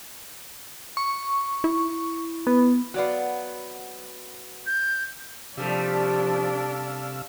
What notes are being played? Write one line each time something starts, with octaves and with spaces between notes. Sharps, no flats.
C#6
E4
B3
F#3 B3 F#4 D5 F5
G6
C3 F3 G3 A3 D4 F5 E6